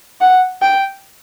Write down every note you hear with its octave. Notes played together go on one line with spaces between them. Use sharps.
F#5
G5